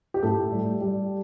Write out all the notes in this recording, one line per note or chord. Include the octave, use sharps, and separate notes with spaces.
G4
A2 A4
G3
G3